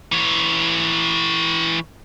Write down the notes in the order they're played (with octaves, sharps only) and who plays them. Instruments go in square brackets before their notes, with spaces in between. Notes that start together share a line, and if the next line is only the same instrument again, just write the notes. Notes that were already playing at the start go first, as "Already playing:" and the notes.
[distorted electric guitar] E3 C#5